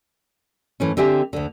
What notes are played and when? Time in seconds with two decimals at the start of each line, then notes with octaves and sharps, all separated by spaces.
0.80 G#2 E3 A3 C#4
0.97 D3 C4 G4 E5 G#5
1.33 D2 D3